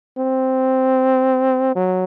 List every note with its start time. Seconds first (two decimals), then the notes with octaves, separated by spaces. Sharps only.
0.17 C4
1.75 F#3